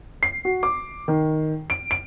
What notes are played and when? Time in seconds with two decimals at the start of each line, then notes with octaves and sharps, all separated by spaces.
0.23 C7
0.45 F#4
0.63 D6
1.08 D#3
1.70 D7
1.91 D7